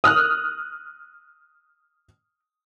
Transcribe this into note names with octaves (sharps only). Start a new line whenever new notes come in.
D#6 F6 F#6